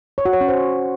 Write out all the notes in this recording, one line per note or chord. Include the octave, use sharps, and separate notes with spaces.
C#5
F#4
C#5
C#4
C5